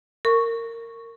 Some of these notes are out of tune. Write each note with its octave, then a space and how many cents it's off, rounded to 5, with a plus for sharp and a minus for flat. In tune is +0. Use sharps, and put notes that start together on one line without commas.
A#4 -20 C#6 +0